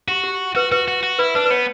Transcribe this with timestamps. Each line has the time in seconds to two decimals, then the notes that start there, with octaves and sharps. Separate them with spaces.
0.08 F#4 G4
0.24 G4
0.55 F#4 B4
0.72 F#4 B4
0.88 F#4
1.03 F#4
1.19 E4 B4
1.35 D4 B4
1.45 B4
1.50 B3 C#5